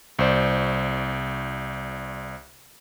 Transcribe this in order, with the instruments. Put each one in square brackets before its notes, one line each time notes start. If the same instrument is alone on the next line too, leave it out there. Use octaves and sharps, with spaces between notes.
[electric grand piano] C2 C5 D5